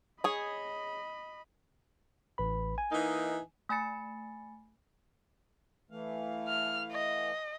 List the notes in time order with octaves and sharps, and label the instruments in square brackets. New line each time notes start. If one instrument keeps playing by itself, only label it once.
[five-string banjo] G#4 C#5 [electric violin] D#5 B5
[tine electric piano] A1 B4 B5
G#5
[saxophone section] E3 A#3 D#4
[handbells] A3 G#5 B5 A6 C#7
[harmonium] E3 A3 F5
[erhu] F6
D#5